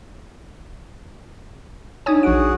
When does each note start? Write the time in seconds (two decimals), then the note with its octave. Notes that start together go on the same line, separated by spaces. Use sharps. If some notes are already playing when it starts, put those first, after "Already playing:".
2.06 D4 D#4 C#5 G#5 D#6 G#6
2.23 A#1 F#4 G#4 F#5 D7